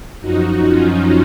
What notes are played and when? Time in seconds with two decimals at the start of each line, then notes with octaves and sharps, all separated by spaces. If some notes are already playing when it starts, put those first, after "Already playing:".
0.20 F#2 F3 D#4 F#4
0.66 C#4 F4